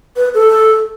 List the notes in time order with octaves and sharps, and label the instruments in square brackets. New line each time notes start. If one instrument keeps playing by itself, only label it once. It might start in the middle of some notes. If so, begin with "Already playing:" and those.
[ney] B4
A4